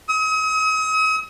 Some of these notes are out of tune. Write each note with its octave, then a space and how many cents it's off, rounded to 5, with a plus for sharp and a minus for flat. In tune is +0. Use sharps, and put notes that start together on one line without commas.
D#6 +40